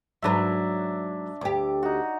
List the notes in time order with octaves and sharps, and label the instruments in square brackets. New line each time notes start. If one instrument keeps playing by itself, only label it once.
[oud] G#2 F#3 B4 [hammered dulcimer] D4 E5
[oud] D2 G4 [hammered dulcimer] D6
[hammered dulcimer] D#4 F#4